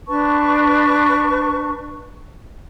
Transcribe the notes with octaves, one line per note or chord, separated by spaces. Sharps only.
D4 B4 A5 C#6